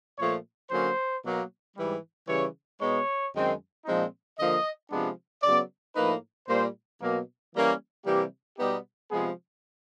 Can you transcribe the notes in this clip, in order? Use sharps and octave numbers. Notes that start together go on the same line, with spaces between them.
A#2 F3 A3 C#5
D3 F#3 A#3 C#4 C5
B2 F#3 A#3
G#2 E3 G3
C#3 E3 G3 C#5
B2 G#3 B3 D#4 C#5
F#2 D#3 G#3 C4
A#2 F3 G#3 C4 D#4
D3 F3 A#3 D#5
C3 F3 G#3 B3 D4
C#3 F#3 B3 D5
A2 F3 A#3 D#4 B4
A#2 G3 A#3 C5
B2 F#3 A#3
E3 G3 A#3 C#4
C3 E3 G3 A#3 G4
B2 G3 B3 D#4 G4
C3 F3 G#3 B3 G#4